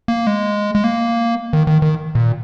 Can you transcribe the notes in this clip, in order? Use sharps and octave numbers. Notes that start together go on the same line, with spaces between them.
A#3
G#3
G#3
A#3
D#3
D#3
D#3
A#2